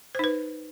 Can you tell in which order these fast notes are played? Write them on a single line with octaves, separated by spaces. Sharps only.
C5 D#4 B4